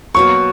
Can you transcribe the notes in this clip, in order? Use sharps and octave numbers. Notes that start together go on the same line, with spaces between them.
B2 F#3 A#3 C#6